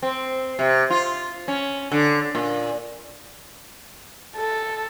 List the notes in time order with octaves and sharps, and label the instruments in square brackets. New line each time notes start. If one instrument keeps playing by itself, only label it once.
[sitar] C4
C3
F4
C#4
D3
A#2
[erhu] A4